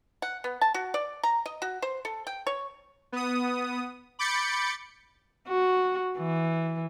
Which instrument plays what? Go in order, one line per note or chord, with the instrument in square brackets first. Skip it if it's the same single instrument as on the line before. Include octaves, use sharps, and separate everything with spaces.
[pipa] F#5
B3
A5
F#4
D5
A#5
D#5
F#4
C5
A4
G5
C#5
[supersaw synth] B3 D#6
B5 D6 G6 A6 C#7
[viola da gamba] F#4
E3